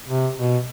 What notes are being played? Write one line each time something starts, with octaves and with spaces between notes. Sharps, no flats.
C3
B2